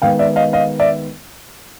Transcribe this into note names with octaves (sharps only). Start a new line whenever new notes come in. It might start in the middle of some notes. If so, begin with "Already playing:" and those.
D#3 G#3 B3 F5 G5
D5 E5
D#5 F5
D#5 F5
D5 E5